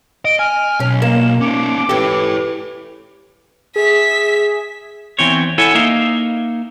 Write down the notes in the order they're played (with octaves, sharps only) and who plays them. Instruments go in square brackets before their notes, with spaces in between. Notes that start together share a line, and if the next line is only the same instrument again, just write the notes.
[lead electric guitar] D#5 [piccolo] D7
[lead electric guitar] G#5 [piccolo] F6
[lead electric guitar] B1 [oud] C#4
[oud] A#3 [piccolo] E7
[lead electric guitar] C#4 D#4 [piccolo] D6
[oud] E3 G4 [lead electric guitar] A4 C#5
[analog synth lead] G#4 [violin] E5 B6
[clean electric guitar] E2 E3 C4 C#5
E4 A4 C#5 E5 F#5 G#5
A#3 D#4 E5 F5